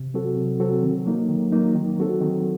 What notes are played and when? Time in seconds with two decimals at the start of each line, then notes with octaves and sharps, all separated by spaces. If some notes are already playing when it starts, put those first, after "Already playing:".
Already playing: C3
0.14 F#3 C4 F#4 A4
0.37 C3
0.60 F#3 C4 F#4 A4
0.83 D#3
1.06 F#3 A#3 D#4
1.29 D#3
1.52 F#3 A#3 D#4
1.75 D#3
1.99 F#3 C4 F#4 A4
2.21 D#3